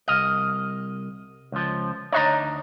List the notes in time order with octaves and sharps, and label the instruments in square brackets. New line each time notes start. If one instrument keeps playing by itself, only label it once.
[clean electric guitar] C2 D#5 [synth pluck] F6
[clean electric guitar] C#2 F3
[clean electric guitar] D2 D4 D#4 [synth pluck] C#5 D#5 A#5